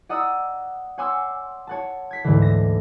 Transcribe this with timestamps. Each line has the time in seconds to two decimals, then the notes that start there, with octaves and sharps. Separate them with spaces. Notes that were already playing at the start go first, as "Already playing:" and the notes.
0.09 D5 D#5 F#5 A#5 D#6 E6
0.98 C#5 F#5 G#5 C6 D6 E6
1.67 C#5 F#5 A5
2.11 G#6 B6 C7
2.24 D2 G#2 D3 E3
2.42 A#6 E7